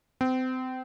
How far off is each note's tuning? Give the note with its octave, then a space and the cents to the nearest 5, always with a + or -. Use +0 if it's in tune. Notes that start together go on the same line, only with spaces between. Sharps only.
C4 -30